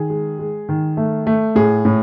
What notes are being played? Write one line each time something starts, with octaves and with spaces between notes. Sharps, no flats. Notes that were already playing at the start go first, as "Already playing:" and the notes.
Already playing: D#3 G#4
G#3
G#3
D#3
A3
A3
A2 G#4
A2